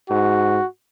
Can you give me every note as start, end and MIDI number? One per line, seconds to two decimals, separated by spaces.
0.10 0.58 44
0.10 0.66 66